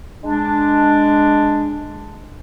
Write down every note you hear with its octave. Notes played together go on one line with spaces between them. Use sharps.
G#3 D4